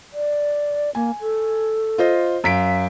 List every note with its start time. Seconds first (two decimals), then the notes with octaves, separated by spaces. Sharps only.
0.13 D5
0.95 A#3 G#5
1.21 A4
1.98 F4 C5 D#5
2.44 F#2 F5 B6 D7